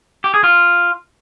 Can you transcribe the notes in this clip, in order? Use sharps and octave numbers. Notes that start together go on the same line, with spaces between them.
G4
G#4
F4